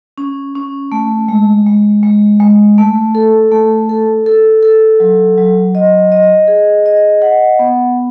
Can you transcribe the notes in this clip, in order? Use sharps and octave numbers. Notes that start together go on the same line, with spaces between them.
C#4
C#4
A3
G#3
G#3
G#3
G#3
A3
A4
A3
A4
A4
A4
F#3
F#3
D#5
D#5
G#4
D#5
F#5
B3